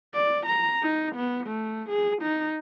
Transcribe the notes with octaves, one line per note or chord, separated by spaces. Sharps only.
D5
A#5
D#4
B3
A3
G#4
D#4